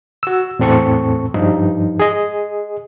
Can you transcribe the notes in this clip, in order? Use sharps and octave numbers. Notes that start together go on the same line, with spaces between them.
F#4 E6
E2 A2 C4 A4 C#6
G2 F3 D#4
G#4 D#5